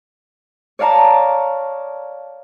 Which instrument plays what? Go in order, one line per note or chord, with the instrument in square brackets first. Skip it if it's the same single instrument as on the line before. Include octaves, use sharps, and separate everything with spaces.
[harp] C#5 D5 F5 A5 A#5